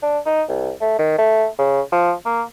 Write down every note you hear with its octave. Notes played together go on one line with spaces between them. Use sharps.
D4
D#4
C2
A3
D#3
A3
C#3
F3
A#3